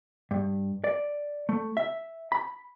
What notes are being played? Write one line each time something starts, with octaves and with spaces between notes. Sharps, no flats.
G2
D5
A3
E5
B5